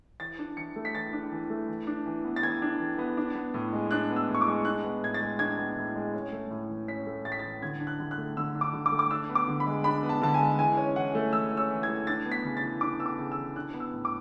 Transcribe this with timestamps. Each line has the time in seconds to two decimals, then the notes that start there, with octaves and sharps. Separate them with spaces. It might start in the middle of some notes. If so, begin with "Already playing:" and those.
0.20 E3 A6
0.39 D4
0.57 E3 C#7
0.76 A3
0.85 B6
0.94 E3 A6
1.13 D4
1.32 E3
1.50 A3
1.68 E3
1.87 D4
2.06 E3
2.25 B3
2.36 A6
2.43 E3 G#6
2.62 D4
2.79 E3
2.98 B3
3.17 D4
3.35 B3
3.54 A2
3.73 G#3
3.91 D4 F#6
4.10 B3
4.16 E6
4.29 A2
4.35 C#6
4.41 D6
4.47 G#3
4.65 D4 F#6
4.83 B3
5.03 A2 G#6
5.14 A6
5.20 G#3
5.39 D4 G#6
5.58 B3
5.77 A2
5.96 G#3
6.14 C#4
6.32 A3
6.51 A2
6.69 E3
6.88 C#4 B6
7.06 A3
7.25 A2 A6
7.32 B6
7.39 A6
7.44 E3
7.62 D3 G#6
7.80 D4
7.87 F#6
8.00 D3
8.11 F#6
8.18 A3
8.37 D3 E6
8.55 D4
8.61 D6
8.74 D3
8.86 D6
8.92 A3
8.99 D6
9.11 D4 E6
9.29 B3
9.35 D6
9.48 D3
9.60 B5
9.66 G#3
9.84 D4 B5
10.03 B3
10.09 A5
10.22 D3 A5
10.34 G#5
10.40 G#3
10.59 E3 G#5
10.77 C#4
10.96 E3 F#5
11.15 A3
11.33 E3 E6
11.52 C#4
11.57 E6
11.71 E3
11.83 G#6
11.89 A3
12.07 D4 A6
12.26 B3
12.32 B6
12.44 C#3
12.57 A6
12.63 E3
12.81 D4 D6
13.00 B3 E6
13.06 D6
13.18 C#3
13.32 E6
13.37 E3
13.56 D4 F#6
13.74 B3
13.80 E6
13.93 A2
14.05 D6